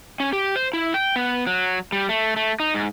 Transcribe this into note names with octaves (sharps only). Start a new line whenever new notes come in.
C#4
G4
C5
E4
G5
B3
F#3
G3
A3
A3
D#4
G#2